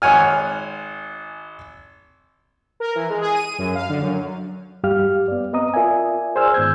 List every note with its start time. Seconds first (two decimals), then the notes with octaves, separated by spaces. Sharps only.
0.02 G#1 C#5 F#5 G#5 F6
2.80 A#4
2.95 E3
3.10 G#3
3.21 G#4
3.34 D#7
3.58 F#2
3.75 F5
3.89 D3
4.02 F#2
4.84 G2 G3 G4 F5 F6
5.28 B3 D5
5.53 B3 C4 D#5 A#5 D#6
5.74 F4 A#4 D5 E5 G#5
6.35 G#4 C5 D5 G#5 E6 F6
6.54 G#2 D#3 B3 E6 G6 G#6